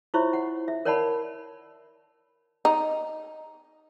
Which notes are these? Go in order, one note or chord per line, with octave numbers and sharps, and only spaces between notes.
E4 F4 C5 C#5 E5 C#6
F#5
E5
A#4 C#5 D5 F#5 A5 B5
D#4